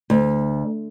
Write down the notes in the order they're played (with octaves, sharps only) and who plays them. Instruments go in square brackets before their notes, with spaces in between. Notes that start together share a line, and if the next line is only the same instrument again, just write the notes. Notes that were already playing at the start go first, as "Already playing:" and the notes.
[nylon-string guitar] D2